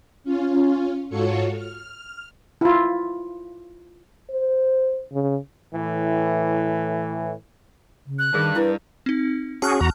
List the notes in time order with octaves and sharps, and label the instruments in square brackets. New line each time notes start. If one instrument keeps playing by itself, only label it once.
[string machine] C#4 F4
G#2 F4 F#4 A4 C#5 C#7
F6
[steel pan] E4 F4
[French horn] C5
C#3
[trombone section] A2 E3
[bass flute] C#3
[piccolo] F#6
[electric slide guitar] G2 [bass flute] D#3 [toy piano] G#4 A#4
[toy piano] E4 [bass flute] B4
[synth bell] C4 D#4
[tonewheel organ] C#4 F#4 G#4 [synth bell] A5 F6 F#6
[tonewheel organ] E2 F#4 A#5